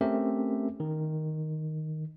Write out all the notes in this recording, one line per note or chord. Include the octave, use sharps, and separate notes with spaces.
A3 C4 C#4 G4 A#4 E5
D#3